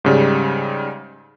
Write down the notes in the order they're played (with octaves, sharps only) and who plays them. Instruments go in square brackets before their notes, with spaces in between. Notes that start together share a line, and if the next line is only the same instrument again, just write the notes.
[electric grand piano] G#2 C#3 G3